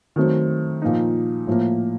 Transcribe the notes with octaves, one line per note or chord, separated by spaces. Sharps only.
D#3 F#3 A3 C4
A#2 F3 A#3 D#4
A2 F3 A#3